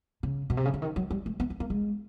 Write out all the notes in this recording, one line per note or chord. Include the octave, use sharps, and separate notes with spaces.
C#3
B2
C3
C#3
D3
D#3
F#3
G3
A3
B3
B3
A#3
G#3